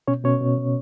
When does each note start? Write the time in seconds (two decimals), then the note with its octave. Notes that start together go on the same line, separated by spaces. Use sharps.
0.08 B2 C#4 C#5
0.24 B2 C#4 C#5
0.41 B2
0.57 B2